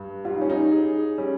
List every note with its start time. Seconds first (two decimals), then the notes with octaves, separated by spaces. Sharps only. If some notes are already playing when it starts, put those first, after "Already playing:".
Already playing: G2
0.25 G3 F4
0.34 D#4
0.41 C#4
0.50 D#4
0.71 G#4
1.18 G3 C#4